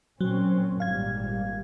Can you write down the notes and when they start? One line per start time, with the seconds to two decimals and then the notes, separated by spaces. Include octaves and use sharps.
0.21 A#2 F#3 C4 C#4
0.80 G#1 A#2 G3 F5 G#6